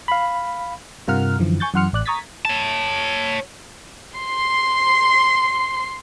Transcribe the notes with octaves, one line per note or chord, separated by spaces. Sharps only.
F5 B5
G2 C3 F4 A#4 F#5 F6
F#2 D3 E3 F3
G#5 C#6 G6 A6
F#2 E3 F#5 C6 F6 C#7
A1 D5 F#6
A#5 C#6 D#6 G#6 A6 B6
C#5 A5
C6 C7